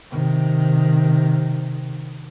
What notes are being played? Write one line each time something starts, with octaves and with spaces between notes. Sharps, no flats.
C3 D#3